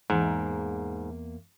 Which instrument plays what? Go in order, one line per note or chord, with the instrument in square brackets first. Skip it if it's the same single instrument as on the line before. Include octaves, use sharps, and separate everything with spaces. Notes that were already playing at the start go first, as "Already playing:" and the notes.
[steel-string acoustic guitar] E2 A#3 [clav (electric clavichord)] G#2